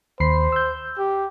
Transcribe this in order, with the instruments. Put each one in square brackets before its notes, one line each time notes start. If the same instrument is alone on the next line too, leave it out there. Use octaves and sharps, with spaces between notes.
[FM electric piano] D#2 B5 C7 [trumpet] C5
[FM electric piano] E6 G6
[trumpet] G4